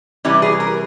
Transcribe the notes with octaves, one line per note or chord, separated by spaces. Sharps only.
C3 E3 G3 C#4 E4
G#4
A#4